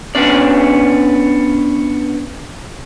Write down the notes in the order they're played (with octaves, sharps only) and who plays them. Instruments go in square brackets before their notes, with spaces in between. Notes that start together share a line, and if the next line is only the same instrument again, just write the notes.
[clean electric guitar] B3 C#4 D4 D5